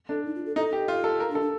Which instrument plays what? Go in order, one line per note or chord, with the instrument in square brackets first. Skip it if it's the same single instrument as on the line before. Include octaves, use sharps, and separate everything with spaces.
[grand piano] D4 [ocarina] A4
[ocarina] D#4
F4
A4
[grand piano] D#4 [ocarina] A4
[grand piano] G4
F4
A4
[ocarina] F4 [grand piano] A#4
[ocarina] D4
[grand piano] A4
[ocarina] D4